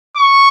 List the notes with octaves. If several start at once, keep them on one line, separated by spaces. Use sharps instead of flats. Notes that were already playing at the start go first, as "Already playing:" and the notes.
C#6